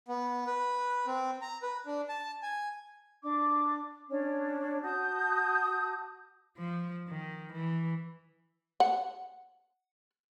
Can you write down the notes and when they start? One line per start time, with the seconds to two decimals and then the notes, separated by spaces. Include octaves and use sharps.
0.08 B3
0.47 B4
1.07 C4
1.42 A#5
1.62 B4
1.86 D4
2.09 A5
2.43 G#5
3.22 D4 D6
4.09 C#4 D4 C#5
4.82 F#4 A5 D#6 G6
6.58 F3
7.08 D#3
7.53 E3
8.80 F#5